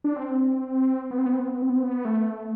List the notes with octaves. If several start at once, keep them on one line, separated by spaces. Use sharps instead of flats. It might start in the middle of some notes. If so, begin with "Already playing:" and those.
D4
C4
B3
C4
B3
C4
B3
C4
B3
C4
B3
C4
B3
A3